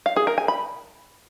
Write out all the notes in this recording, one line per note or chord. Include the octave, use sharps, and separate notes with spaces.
F5
G#4
A#4
G#5
B5